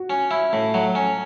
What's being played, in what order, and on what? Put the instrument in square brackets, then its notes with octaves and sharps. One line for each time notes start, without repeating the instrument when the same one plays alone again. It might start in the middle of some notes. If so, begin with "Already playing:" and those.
Already playing: [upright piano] F#4
[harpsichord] C#4
E4
A2
F#3
C#4